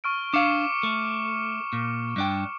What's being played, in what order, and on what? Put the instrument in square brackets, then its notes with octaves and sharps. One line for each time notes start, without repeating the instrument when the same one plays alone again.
[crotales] C#6 F6 D7
[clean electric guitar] D4 F5 [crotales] D6 C#7 E7
[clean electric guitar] A3
A#2
G2 D4 G5